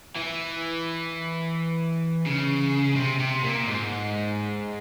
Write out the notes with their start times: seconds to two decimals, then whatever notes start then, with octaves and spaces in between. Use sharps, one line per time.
0.16 E3
2.26 C#3
2.96 C3
3.19 C3
3.44 A#2
3.66 G#2